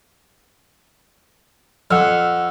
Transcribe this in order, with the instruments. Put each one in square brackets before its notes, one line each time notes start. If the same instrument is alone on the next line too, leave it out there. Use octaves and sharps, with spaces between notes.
[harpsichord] F2 [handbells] F#5 E6 F6